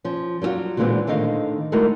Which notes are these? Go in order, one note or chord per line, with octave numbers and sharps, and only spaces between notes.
F3 C#4
F#3 G3 C#4 F4 F#4
A#2 D3 E3 G#3 B3 C4
A2 D3 D#3 C4 D#5 F5
G#3 A3 D#4 E4 F#4 A#4